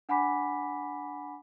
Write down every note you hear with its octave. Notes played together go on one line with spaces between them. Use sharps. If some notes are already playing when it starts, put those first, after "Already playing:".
D4 F#5 G#5 B5 D6 B6